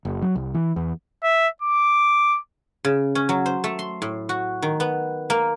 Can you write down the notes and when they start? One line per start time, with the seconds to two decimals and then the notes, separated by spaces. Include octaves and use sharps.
0.05 F#1
0.22 F#3
0.35 C2
0.55 E3
0.76 E2
1.23 E5
1.62 D6
2.85 C#3
3.15 C#4
3.29 F#3
3.46 C5
3.64 A3
3.79 C6
4.02 A2
4.29 F#4
4.62 D#3
4.80 B3
5.30 A#3